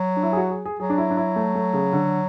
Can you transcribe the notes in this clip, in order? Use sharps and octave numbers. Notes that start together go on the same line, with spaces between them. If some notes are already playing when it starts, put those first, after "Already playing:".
Already playing: F#3
D4
E4
G#4
F#4
G#4
G#4
F#3 G#4
D4
E4
D4
E4
A3
A3
C#3
D3